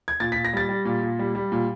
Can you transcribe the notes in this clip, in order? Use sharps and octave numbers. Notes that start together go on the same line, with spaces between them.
G#6
A#2 A6
A#2 B6
A#6
G3 A6
G3
A#2
A#2
G3
G3
A#2